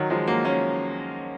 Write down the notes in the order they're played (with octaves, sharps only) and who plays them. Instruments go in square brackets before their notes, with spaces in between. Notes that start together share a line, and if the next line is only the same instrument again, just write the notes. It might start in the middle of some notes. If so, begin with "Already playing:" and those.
Already playing: [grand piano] D#3 F#3
F3 G#3
F#3 A#3
A#3 C#4